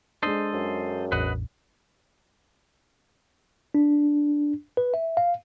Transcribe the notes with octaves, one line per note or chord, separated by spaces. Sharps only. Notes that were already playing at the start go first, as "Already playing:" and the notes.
G#3 D4 A4 C5 D#5
F#2
A1 E2 B4 D#5 F#5
D4
B4
E5
F5